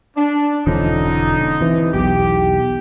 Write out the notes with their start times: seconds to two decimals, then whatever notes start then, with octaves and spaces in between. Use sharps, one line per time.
0.17 D4
0.67 E1 D3 F3 C#4 D#4
1.60 C3 E3
1.94 B1 E2 G4